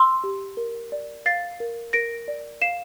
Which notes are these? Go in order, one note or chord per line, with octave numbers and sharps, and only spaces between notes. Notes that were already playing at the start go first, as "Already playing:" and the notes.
Already playing: C6 E6
G4
A#4
D5
F5 A6 C7
A#4
A#4 A#6 D7
D5
F5 C7 E7